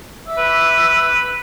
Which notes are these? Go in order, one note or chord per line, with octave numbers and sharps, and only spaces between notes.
E5 D6 E6
B4